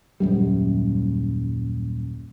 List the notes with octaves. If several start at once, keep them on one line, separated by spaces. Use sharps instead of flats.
D#1 F#2 G3